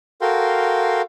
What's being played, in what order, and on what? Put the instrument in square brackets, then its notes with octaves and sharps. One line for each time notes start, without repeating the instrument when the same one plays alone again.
[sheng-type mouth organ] F#4 A4 A#4 F5 G5 C6